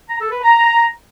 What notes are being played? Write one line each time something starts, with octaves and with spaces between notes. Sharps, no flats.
A#5
A4
B4
A#5